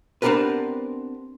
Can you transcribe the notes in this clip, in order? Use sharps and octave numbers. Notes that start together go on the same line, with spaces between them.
B3 C4 D4 G4 A#4 B4